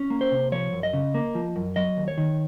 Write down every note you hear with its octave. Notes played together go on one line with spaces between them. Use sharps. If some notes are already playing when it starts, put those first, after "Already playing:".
Already playing: C#4
A#3
C5
C3
F3 C#5
F#2
D#5
C#3
A#3
F3
F#2
F#3 D#5
D#2
C#5
D#3